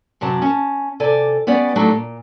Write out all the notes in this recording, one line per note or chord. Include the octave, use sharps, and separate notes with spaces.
F#2 C3 F#3 A5
C#4 A5
C3 A4 D5 G#5
G3 B3 C#4 D5
F#3 G3 A3 D4 D#4
A#2